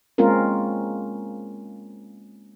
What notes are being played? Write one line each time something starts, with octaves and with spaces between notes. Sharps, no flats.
G#3 A#3 C4 C#4 F4 A#4